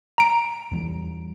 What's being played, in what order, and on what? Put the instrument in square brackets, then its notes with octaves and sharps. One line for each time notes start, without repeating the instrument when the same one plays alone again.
[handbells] A#5 D7
[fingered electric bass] E2 E3 G3